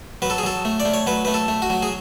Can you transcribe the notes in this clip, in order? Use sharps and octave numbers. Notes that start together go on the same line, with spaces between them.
F#3 B4
A4
G#4
F#3 A4
A3
D5
A3
C#5
F#3 B4
A3 B4
A4
A3
F#4
F#3
G#4